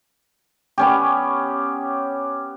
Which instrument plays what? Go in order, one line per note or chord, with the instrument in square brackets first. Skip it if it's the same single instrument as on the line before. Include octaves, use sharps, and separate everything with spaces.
[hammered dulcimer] B3 C#4 G4